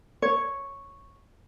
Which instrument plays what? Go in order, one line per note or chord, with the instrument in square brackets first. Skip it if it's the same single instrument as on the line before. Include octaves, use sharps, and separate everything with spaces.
[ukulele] C#5